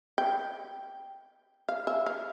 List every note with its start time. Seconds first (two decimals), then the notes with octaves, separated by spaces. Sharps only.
0.18 G5
1.69 F5
1.87 E5
2.06 F5